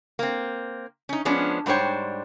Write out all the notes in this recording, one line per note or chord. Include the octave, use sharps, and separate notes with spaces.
A#3 C4
C#4 D#4
F3 G#3 B3 C#4 D4
G#2 G3 D4 C5 C#5 G5